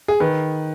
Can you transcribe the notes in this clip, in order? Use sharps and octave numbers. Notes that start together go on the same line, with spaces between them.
G#4
D#3 B4